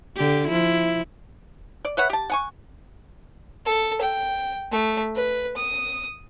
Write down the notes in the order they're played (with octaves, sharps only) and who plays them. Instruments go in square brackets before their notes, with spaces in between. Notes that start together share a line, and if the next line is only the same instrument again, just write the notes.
[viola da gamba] D3 G4
F3 E4
[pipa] D5
B4 C#5 E5 F#5
G4 A5
F#5 G#5 C#6
[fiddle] A4
G5
A3
B4
D#6